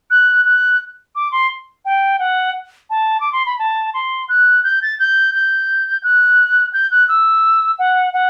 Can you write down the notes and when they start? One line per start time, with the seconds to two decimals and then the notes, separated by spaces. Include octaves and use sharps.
0.11 F#6
0.46 F#6
1.15 D6
1.32 C6
1.85 G5
2.19 F#5
2.90 A5
3.20 D6
3.32 C6
3.46 B5
3.59 A5
3.94 C6
4.29 F#6
4.64 G6
4.82 A6
4.99 G6
5.34 G6
6.04 F#6
6.73 G6
6.91 F#6
7.08 E6
7.79 F#5
8.13 F#5